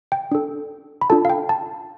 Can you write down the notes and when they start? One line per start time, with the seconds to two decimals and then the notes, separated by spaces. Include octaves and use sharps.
0.12 G5
0.32 D4 A4
1.02 B5
1.10 D4 F4 A4 A5
1.25 F5
1.30 G5
1.49 A5